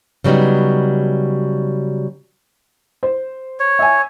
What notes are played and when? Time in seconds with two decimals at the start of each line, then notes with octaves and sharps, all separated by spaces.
0.24 C#3 F#3 G3 B3 D#4
3.03 C5
3.60 C#5
3.79 E5 G#5